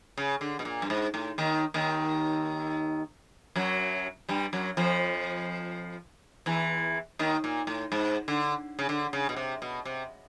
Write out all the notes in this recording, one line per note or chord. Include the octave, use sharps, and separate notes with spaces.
C#3
D3
B2
A#2
G2
G#2
A2
D#2 D#3
D#2 D#3
F#2 F#3
G2 G3
F#2 F#3
F2 F3
E2 E3
D#2 D#3
A#2
A2
G#2
D3
C#3
D3
C#3
B2
C3
B2
C3